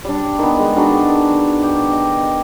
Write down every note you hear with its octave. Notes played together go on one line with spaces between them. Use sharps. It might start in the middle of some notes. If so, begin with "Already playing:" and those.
G3 D4
D#3 B3
G#3 D#5
D#3 D4 F#4
G4
D#5